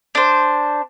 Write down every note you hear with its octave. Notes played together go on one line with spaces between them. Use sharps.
D4 C5